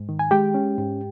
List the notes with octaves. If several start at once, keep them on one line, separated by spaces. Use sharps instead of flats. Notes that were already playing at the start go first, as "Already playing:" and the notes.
Already playing: G#2
D#3
G#5
G#3 G4 G5
C#4
G#2